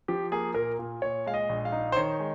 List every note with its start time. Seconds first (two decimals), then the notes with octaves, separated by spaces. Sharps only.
0.08 F3 G4
0.32 A#3 G#4
0.54 A#2 A#4
0.79 A#2
1.02 A#2 C#5
1.26 G#3 F5
1.34 D#5
1.49 A#1
1.65 F5
1.72 D#4
1.92 C5
1.96 D#3 C#5
2.20 G#3